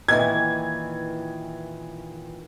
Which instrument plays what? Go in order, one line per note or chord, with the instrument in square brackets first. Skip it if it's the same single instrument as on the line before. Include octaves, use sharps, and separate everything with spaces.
[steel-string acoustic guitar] A#2 D#3 E3 [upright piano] G#6